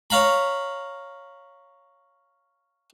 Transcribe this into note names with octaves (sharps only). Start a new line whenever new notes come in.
C#5 F5 A#5 B5